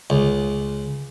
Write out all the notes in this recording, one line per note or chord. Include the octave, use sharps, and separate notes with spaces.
C#2